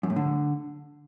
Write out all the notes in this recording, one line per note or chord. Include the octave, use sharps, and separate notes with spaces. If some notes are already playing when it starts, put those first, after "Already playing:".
F#2
A2
D3